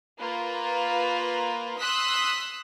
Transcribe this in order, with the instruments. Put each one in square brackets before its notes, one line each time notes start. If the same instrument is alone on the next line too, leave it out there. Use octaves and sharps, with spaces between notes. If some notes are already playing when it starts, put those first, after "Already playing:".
[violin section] A#3 F4 B4
C6 D#6 E6 F#6 B6